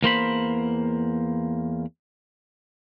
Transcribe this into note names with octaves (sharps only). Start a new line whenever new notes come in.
E2 A#3 C5 B5